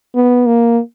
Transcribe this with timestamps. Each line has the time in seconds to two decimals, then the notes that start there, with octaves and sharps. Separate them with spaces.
0.15 B3
0.46 A#3